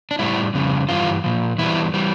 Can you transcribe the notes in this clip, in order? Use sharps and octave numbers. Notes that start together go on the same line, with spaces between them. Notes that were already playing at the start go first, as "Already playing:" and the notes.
D4
A2 G3 E4
F2 C#3 G3
G2 E3 G3 F4
A#2 F3
E2 E3 G3 E4
E3 G3